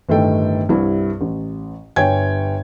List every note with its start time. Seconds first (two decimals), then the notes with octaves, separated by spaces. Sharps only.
0.09 G1 A2 D#3 A4 G5
0.69 C2 G2 E4
1.21 A1
1.96 G1 C#5 G5 G#5 G#6